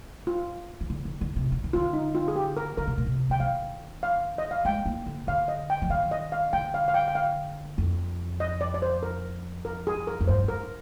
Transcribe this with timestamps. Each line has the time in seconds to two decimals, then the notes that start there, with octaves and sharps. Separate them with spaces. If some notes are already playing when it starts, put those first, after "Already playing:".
0.27 F4
0.81 D#3
0.90 D3
1.05 D3
1.21 D3
1.36 C3
1.52 D3
1.64 D#3
1.73 D3 F4
1.93 D#4
2.15 F4
2.28 G#4
2.36 G4
2.57 A#4
2.77 D3 A#4
2.87 C3
2.98 A#2
3.07 C3
3.30 D3 G5
3.40 D#3 F5
4.03 F5
4.38 D#5
4.51 F5
4.65 G#3 G5
4.86 A#3
5.06 D3
5.27 D3 F5
5.48 D#5
5.70 G5
5.82 F3
5.90 D#3 F5
6.11 D#5
6.32 F5
6.53 D3 G5
6.74 F5
6.88 F5
6.94 G5
7.08 G5
7.15 F5
7.78 F2
8.40 D#5
8.61 D5
8.74 D5
8.82 C5
9.03 A#4
9.65 A#4
9.87 G#4
10.07 A#4
10.21 F2
10.28 G2 C5
10.44 G#2 A#4